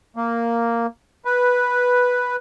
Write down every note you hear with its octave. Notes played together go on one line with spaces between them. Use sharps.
A#3
B4